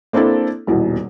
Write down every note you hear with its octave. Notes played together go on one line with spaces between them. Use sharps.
A#3 C4 D4 E4 A4
D#1 E2 B2